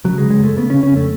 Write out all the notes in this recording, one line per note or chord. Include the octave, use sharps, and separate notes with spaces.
C#3 F#3
G#3
C#3
G#3
F#2 A3
C#3 B3
C#3 C#4
C#4
F2 A3